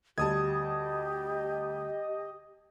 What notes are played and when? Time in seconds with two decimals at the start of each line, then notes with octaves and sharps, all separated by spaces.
0.18 D2 G3 G4 D#5 A5 D#6 G#6